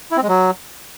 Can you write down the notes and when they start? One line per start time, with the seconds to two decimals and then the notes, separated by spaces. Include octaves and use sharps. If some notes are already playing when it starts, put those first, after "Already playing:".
0.11 E4
0.17 C4
0.23 G#3
0.28 F#3